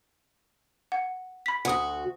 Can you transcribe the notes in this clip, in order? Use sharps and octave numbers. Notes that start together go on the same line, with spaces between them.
F#5
B5 B6
D2 F#4 F#5 D#6